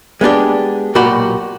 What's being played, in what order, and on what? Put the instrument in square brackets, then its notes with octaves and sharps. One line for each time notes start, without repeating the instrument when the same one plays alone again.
[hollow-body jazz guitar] G#3 B3 D4 G4
B1 A#2 F#4 G4 B5